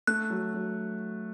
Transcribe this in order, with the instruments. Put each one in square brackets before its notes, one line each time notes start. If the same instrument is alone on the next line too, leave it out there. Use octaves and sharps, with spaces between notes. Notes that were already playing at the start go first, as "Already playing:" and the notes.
[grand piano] A3 [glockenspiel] F#6
[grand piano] F#3
F#3